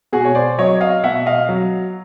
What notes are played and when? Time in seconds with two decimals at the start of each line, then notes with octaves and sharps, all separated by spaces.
0.13 B2 F#4 G#4
0.25 C#5
0.35 C5 D5
0.58 F#3 C#5 D#5
0.81 D#5 F5
1.04 B2 E5 F#5
1.26 D#5 F5
1.49 F#3